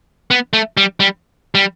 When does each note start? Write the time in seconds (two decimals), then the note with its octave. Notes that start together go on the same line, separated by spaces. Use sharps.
0.31 B3
0.53 A3
0.77 G3
1.00 G3
1.55 G3